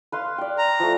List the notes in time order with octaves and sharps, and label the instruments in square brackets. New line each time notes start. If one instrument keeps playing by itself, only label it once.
[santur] B4 F5 C6
D5 G5
[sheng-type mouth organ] A#5
[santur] F3 A3